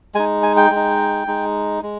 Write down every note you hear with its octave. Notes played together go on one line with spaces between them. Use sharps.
G#3 D#4 G#5
G#5
G5
G#3
D#4
G#3 D#4
G#3